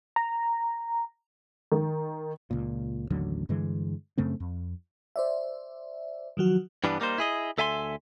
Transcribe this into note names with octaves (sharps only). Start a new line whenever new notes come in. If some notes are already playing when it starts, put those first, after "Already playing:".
A#5
D#3
C#2 A#2
A1 D#2 D3 F#3
G2 D3 E3 G#3
F#2 C#3 A3 C4
F2
C5 D5 E5
D#3 F3 F#3 F#4
G2 E3 G3 B3 D4
G3 A#3 D#4 C5
E4 G#4 D#5
D2 A4 E5 G#5 A5 C6